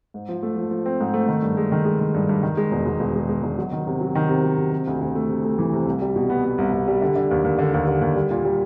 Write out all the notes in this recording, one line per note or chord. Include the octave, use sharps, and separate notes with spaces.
G#2
F3
A3
F3
F3
C4
G#2
A3
D#3
G2
G#3
D#3
G#3
D#3
G2
G2
D#3
G#3
E1
E1
E1
G#3
G#3
E1
F#3
D#3
C3
F#3
D#3
C3
F#3
C3
C3
D2
D2
A3
C3
A3
E3
C3
C2
G3
B2
B3
B3
C2
C2
G3
D3
D3
D#2
D#2
D3
D#2
D3
D#2
G3
A#2
G3